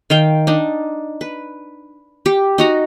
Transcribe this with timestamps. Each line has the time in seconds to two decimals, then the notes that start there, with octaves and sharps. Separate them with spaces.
0.10 D#3 F5 G5
0.47 D4 D#4
1.21 B4
2.26 G4
2.58 D#4 F#4 A#5